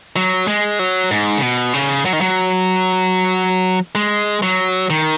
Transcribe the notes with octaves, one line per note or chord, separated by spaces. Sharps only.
F#3
G#3
F#3
G#2
C#3
B2
C#3
F#3
D#3
F#3
G#3
F#3
D#3